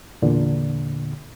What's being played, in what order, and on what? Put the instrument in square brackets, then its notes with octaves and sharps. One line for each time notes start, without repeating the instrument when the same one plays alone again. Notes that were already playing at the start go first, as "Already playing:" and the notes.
[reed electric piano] E2 A#2 D3